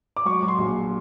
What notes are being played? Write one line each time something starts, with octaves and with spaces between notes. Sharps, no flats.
D6
F#3 C#6
F#3
C6
A#1